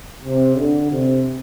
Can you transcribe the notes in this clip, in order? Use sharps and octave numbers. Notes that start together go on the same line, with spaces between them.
C3
D3
C3